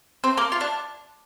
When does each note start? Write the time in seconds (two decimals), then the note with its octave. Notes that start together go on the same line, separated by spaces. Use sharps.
0.24 C4 C5
0.37 A#3 A#4
0.52 F4
0.61 D4